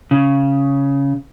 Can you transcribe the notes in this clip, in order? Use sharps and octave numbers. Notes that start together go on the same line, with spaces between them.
C#3